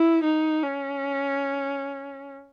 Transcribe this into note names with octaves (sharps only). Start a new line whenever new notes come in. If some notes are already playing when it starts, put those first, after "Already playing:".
Already playing: E4
D#4
C#4